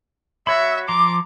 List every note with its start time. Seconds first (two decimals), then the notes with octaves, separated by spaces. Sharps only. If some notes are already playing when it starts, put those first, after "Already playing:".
0.47 F#4 C#5 E5 B5
0.88 F3 A#5 C6 D6